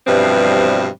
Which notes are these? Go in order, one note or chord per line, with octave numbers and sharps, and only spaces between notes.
G2 B2 E3 F3 G3 C4